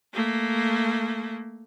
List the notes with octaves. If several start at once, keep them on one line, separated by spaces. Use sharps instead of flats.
A3 A#3